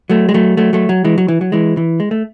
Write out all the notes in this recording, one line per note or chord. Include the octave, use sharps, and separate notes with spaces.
F#3 A3
G#3
F#3 A3
F#3 A3
F#3 A3
F#3
E3 G#3
F#3
E3
F#3
E3 G#3
E3
G#3
A3